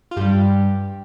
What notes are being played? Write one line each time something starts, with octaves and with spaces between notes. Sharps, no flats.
F4
G2 G3 G4